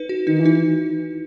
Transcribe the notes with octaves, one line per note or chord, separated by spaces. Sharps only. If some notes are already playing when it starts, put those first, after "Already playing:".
Already playing: D#4 B4
F#4
D#3 D#4
E3
D#4